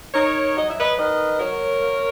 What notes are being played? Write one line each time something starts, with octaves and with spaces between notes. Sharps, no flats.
D#4 A#4 C#5
F#3 D#5
E5
B4 D#5
D#3 B4 D#5
F#3 A#4 C#5
A#3